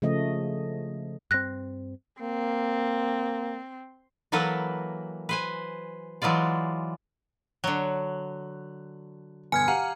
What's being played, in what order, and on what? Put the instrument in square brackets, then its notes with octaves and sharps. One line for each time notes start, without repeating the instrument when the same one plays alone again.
[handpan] C#3 F3 A3 D#5
[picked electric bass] G2 C4 [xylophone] F#6 A#6
[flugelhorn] A#3 [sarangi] C4
[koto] E3 F#3 A#3 A4 B4
B4 C5 G#5
E3 F#3 G#3 F4 D5
[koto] D3 F#3 [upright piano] F#6
[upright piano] G2 B2 D3 [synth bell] G#5 F6 G#6
[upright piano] G4 F5 F#5 [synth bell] A#5